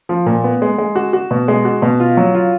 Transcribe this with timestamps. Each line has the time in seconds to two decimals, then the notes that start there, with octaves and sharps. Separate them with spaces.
0.09 F3
0.26 A#2
0.44 B3
0.62 G#3
0.78 G#3
0.96 F#4
1.13 F#4
1.31 B2
1.48 G#3
1.65 F#4
1.82 B2
2.00 F4
2.17 F#3
2.35 F4